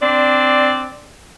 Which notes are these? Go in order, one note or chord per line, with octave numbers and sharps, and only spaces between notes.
C4 D4 D5